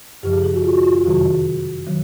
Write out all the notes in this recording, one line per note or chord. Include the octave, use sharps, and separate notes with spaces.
F#2 C#3 F3 G4
G#4
G#4
F#4
F4
F#4
F4
F#4
F2 C3 D#3 F#3 G#4
D#3 F#3